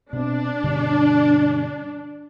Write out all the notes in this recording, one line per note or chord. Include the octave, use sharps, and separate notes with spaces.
B2 C4 D4
G2 B2 D3